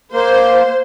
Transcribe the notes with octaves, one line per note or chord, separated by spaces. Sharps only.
A#3 C5